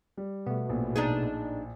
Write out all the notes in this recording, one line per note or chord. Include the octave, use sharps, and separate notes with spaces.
G3
B2 A3 B3
A#1 A2
D4 D#4 G#4